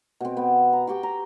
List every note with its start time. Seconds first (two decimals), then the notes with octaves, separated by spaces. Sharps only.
0.20 B2 C4
0.37 B3
0.73 A#5
0.87 F#4 G4 G5 A5
1.03 A#5